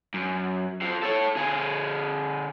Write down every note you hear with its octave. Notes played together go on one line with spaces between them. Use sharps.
F#2
F2 F3
A4 C#5
D3 G#4